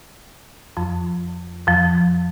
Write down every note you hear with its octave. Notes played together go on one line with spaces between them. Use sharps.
F2 F3
F2 F3